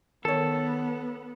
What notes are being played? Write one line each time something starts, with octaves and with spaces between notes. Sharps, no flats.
D#3 B3 A4 C#5